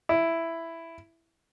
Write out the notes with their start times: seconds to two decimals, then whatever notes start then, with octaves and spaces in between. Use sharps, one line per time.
0.09 E4